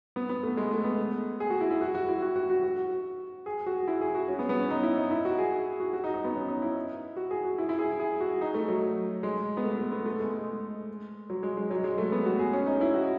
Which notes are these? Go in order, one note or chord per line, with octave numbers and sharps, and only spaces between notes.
B3
B3
A3
G#3
A3
B3
G#4
F#4
E4
E4
F#4
F#4
E4
F#4
F#4
F#4
F#4
G#4
F#4
E4
G#4
F#4
C#4
B3
B3
C#4
D#4
E4
D#4
E4
F#4
G#4
F#4
F#4
D#4
D#4
B3
C#4
D#4
E4
F#4
G#4
F#4
E4
E4
G#4
G#4
F#4
D#4
A3
F#3
G#3
B3
A3
A3
B3
A3
G#3
G#3
F#3
G#3
G#3
F#3
G#3
A3
B3
F#4
G#4
C#4
D#4
E4
F#4